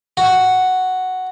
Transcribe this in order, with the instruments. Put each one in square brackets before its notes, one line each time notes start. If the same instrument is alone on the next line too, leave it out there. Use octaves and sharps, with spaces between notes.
[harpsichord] F#4